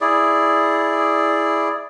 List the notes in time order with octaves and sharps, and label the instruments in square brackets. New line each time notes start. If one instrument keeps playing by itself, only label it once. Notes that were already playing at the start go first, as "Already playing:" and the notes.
[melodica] E4 G#4 D5